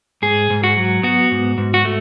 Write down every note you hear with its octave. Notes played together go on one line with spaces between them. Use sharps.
G#2 G#4
G#2
F#4
F#3
B3 F#4
G#2
G#2
F#4
A3